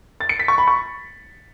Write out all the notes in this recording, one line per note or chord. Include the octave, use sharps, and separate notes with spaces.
A6
C#7
B6
C#6
B5
C#6